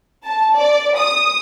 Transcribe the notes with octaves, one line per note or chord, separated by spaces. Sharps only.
A5
D5
D#6